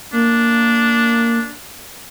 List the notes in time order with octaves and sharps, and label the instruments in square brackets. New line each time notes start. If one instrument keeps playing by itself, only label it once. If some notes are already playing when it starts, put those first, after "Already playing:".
[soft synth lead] A#3 [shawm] D4